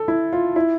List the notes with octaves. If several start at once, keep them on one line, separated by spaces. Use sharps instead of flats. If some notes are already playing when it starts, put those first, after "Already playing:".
Already playing: A4
E4
F4
E4